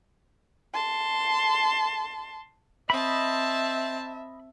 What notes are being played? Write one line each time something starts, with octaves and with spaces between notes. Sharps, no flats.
A5 C6
C4 D#5 E5 A5 B5